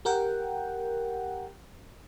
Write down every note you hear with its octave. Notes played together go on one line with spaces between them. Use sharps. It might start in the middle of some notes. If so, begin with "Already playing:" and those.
G4 A#4 F#5 G5